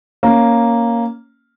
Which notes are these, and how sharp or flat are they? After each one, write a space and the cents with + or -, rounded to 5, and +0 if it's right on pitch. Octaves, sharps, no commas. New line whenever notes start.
A#3 +0 C#4 +0